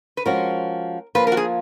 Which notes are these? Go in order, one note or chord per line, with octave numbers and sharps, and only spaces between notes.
B4
F3 G#3 C#4 F#4 A#4
F3 A#3 F4 B4
A#4
F#4
G#4